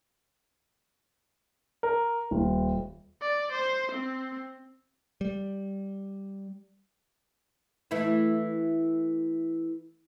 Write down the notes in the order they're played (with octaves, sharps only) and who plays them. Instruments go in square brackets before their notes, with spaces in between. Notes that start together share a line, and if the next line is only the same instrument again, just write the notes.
[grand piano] A#4
D#1
[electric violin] D5
C5
C4
[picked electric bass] G3
[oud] E3 A3 E4